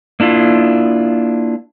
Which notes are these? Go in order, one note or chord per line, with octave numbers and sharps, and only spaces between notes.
A#3 D4 E4 F4